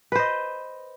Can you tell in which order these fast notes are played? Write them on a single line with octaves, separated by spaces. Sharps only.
B4 C5 D#5